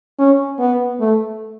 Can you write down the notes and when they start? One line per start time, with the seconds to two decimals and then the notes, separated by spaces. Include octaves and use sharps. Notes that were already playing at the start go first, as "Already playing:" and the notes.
0.19 C#4
0.59 B3
1.00 A3